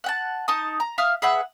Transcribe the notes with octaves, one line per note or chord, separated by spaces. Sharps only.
F#5 G5 A5
D#4 A5 D#6
A#5
E5 F5 D#6 F6
G#4 B4 E5 F#5